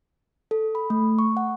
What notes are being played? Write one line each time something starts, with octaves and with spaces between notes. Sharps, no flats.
A4
B5
A3
C#6
F#5